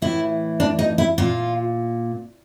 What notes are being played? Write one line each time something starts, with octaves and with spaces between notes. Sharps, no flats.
A2 E3 E4
D4
D#4
E4
A#2 F4